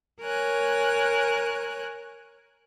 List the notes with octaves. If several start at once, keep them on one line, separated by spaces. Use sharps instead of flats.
A#4 C#5 G#5 F#6